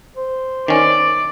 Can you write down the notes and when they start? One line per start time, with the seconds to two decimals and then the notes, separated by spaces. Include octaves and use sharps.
0.17 C5
0.68 D#3 C#4 D5